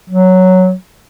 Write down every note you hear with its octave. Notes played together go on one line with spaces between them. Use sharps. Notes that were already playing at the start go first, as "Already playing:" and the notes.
F#3